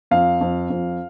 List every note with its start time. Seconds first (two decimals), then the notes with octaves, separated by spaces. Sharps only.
0.11 F2 F5
0.41 F2
0.70 F2